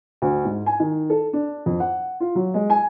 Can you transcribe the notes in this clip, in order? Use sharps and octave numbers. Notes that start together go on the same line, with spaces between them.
D2
G#2
G#5
D#3
A4
D4
F2
F#5
F4
F#3
G#3
G#5